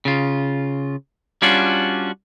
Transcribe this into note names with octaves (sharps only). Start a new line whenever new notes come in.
C#3 F4
G3 C#4 D4 F4 F#4